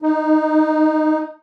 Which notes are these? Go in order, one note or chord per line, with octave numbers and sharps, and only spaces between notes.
D#4